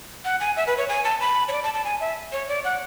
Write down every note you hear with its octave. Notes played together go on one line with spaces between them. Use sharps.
F#5
G#5
E5
B4
C#5
G#5
A5
B5
C#5
D5
A5
A5
G#5
E5
C#5
D5
F#5